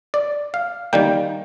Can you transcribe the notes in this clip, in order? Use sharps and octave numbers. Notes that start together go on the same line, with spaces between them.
D5
F5
D#3 G3 A#3 G5